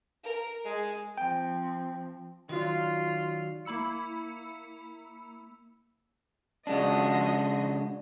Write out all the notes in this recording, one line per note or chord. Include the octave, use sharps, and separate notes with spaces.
A#4
G#3
F3 C4 G5
D#3 F#3 F4 F#4 D5
A#3 E4 B5 E6 C#7
C#3 F3 G#3 D4 F#4 D#5